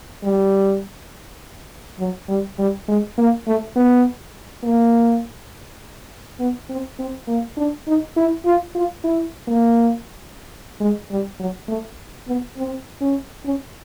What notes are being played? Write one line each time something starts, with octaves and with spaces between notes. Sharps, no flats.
G3
F#3
G3
G3
G#3
A#3
A3
B3
A#3
B3
C4
C4
A#3
D4
D#4
E4
F4
F4
E4
A#3
G#3
G3
F#3
A3
B3
C4
C#4
C#4